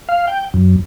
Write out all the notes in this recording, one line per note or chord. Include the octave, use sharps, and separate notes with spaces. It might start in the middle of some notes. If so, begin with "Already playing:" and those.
F5
G5
F#2